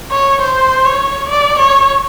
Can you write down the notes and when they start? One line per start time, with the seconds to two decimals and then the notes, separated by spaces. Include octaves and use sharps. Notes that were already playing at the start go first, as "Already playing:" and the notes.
0.11 C#5
0.42 C5
0.85 C#5
1.30 D5
1.59 C#5